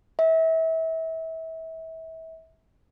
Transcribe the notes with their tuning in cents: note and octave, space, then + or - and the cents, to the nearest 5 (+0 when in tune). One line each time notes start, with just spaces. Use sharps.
E5 -30